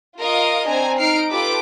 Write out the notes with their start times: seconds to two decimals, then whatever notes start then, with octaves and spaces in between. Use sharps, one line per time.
0.19 F4 A#4 D#5 F5 D#6
0.67 C4 D4 G#5 A#5
0.99 D#4 F6 C7 D7
1.29 F4 G4 A4 B4 D6